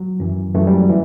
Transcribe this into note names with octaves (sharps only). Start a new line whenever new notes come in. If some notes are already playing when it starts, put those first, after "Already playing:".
Already playing: F#3
F#2 E3
F#2 E3 A3
G3
F#3
E3